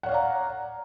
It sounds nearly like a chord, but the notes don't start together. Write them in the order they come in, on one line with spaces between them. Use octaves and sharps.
F#5 C#5 F5 D5 A#5